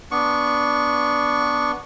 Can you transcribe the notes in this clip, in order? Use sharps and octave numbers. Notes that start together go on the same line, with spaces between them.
B3 D4 C#6